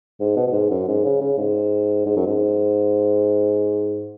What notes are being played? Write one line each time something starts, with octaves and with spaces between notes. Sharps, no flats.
G#2
B2
B2
G#2
F#2
G#2
C#3
C#3
G#2
G#2
F#2
G#2